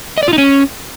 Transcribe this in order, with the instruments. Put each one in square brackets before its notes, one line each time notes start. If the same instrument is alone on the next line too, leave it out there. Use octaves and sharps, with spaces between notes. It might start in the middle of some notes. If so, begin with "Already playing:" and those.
[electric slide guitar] D#5
D5
F4
D#4
C#4